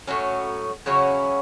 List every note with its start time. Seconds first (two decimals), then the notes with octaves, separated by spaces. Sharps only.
0.08 A2 F#3 C#4
0.86 C#3 F#3 C#4 E4